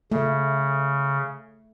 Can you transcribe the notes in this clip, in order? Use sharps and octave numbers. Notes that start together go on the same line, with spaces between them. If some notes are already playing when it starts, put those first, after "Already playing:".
C#3 A3